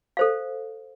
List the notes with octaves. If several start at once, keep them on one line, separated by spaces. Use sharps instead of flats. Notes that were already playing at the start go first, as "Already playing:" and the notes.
A4 C5 F5